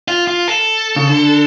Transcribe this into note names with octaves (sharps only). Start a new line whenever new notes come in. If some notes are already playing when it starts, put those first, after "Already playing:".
F4
F4
A4
C#3
D3